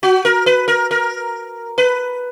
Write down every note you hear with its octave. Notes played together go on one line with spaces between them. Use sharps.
F#4
A#4
B4
A#4
A#4
B4